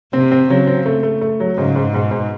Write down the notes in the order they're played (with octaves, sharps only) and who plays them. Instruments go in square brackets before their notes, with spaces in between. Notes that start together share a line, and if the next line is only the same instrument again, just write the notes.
[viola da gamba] C3 [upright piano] C4
[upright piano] C4
[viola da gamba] C#3 [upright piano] F#3
[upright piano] C4
A3
A3
A3
F#3
[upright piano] G#2 [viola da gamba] C#3
[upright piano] G#2
[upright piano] G#2 [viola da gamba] B2
[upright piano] G#2